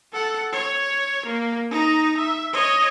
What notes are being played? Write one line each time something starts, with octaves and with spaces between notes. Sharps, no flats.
A4 F#5
C#5
A#3
D#4 A#5
E5
C#5 D#5